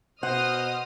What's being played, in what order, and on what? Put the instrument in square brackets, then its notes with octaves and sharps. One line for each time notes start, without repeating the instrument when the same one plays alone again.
[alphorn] B2 [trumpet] C5 [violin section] D#5 D#6 F6 [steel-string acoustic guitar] F#5